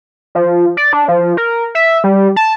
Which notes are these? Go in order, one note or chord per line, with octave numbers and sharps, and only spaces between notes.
F3
D5
D4
F3
A#4
E5
G3
A5